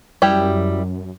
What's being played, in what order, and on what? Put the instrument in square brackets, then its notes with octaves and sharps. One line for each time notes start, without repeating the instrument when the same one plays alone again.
[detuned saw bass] F#2 [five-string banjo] G3 E4 G4